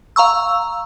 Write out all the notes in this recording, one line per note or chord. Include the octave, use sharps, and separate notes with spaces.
F5 A#5 C#6 E6